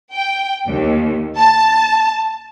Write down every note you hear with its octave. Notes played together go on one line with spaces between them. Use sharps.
G5
D#2
A5